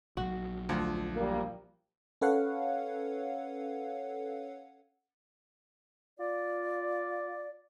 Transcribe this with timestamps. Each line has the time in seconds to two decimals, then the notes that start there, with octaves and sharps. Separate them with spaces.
0.17 A#1 F#3 F#4
0.69 D2 F3
1.15 G3 A#3
2.21 C#4 A4 B4 C#5 F5 F#5
6.19 F4 D5